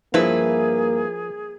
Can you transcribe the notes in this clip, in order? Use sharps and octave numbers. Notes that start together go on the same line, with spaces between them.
G2 F3 A#3 E4 G#4 B4